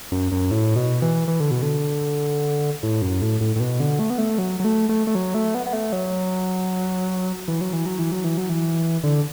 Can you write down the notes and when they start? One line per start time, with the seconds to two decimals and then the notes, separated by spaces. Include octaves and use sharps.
0.12 F#2
0.32 F#2
0.51 A2
0.76 B2
1.02 E3
1.28 E3
1.40 D3
1.51 B2
1.62 D3
2.83 A2
3.02 F#2
3.22 A2
3.41 A2
3.56 A2
3.60 B2
3.80 D3
3.99 A3
4.10 B3
4.18 A3
4.38 F#3
4.60 F#3
4.64 A3
4.89 A3
5.07 A3
5.15 F#3
5.34 A3
5.55 B3
5.67 B3
5.73 A3
5.93 F#3
7.48 E3
7.61 F#3
7.73 E3
7.86 F#3
7.99 E3
8.12 F#3
8.24 E3
8.37 F#3
8.49 E3
9.04 D3